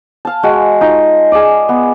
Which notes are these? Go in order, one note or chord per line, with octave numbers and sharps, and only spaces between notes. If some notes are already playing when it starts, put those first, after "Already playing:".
F5 A5
G#3 F#4
D#4 F4
G#4 D5
B3